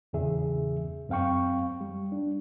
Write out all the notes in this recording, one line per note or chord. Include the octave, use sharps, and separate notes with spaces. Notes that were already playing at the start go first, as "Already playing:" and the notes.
E2 A#2 C#3 E3 G#4 E5
F#2 C4 F5 G5 C#6
G3
D4